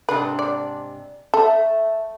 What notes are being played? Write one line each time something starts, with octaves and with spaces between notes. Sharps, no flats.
G#2 C3 D4 B4
D5
A3 A4